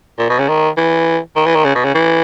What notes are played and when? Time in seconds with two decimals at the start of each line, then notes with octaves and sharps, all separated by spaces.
0.19 A#2
0.30 B2
0.39 C#3
0.49 D#3
0.77 E3
1.36 D#3
1.46 E3
1.56 D#3
1.65 C#3
1.75 B2
1.84 C#3
1.95 E3